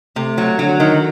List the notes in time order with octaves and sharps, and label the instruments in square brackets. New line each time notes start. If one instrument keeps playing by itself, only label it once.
[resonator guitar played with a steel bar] C3 [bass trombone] A3
[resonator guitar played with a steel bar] F#3
[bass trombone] D3 [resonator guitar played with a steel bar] F#3
[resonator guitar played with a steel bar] D#3